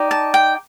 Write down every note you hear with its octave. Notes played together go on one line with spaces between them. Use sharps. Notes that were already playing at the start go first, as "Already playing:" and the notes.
Already playing: D#4 G4 D5
A5
G5